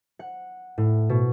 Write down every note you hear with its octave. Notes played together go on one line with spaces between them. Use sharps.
F#5
A2
B2